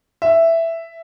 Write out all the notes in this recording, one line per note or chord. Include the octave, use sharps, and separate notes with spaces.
E5